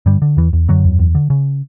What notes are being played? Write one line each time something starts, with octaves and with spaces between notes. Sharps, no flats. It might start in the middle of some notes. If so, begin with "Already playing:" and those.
G2 D3 G3
D3
E2 E3
E2
F#2 D3 F#3
E2
E2
D3
C#3